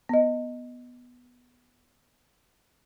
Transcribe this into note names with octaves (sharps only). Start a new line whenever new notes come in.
B3 D#5